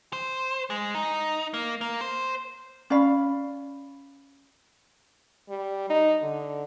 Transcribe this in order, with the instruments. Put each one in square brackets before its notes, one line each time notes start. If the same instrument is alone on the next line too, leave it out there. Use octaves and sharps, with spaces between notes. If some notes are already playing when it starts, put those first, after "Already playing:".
[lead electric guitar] C5
G#3
D#4
A#3
A#3
C5
[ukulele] C#4 D5 F5 B5
[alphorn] G3
D#4
D3